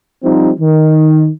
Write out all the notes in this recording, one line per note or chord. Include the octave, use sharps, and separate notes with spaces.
F3 G3 C4 D#4
D#3